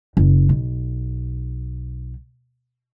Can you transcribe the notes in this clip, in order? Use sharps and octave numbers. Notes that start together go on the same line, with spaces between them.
F#1
B1